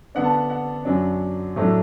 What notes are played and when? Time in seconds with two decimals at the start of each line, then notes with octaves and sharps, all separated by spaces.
0.15 D3 B3 D4 F#5
0.24 A5
0.32 F#5
0.50 F#5
0.85 F#2 F#3 D4
1.56 A2 F#3 A3 D4